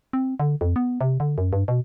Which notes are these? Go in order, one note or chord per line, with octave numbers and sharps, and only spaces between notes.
C4
D3
F2
B3
C3
D3
F#2
G2
B2